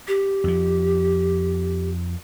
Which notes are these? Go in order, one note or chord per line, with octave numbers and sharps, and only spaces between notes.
G4
F2 F3